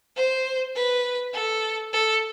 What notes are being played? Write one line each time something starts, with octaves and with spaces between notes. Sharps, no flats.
C5
B4
A4
A4